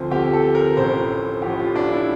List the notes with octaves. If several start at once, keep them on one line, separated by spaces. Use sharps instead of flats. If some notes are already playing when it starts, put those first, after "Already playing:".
Already playing: D2 C3 F3 C5
D2 C3 F3 G4
A4
A#4
A1 A2 F3 C5
A1 A2 F3 G4
F4
D4
E4